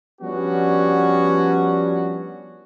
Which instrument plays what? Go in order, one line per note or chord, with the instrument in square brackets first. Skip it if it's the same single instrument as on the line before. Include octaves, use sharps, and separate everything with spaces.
[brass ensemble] F3 G3 B3 C#4 D4 F#4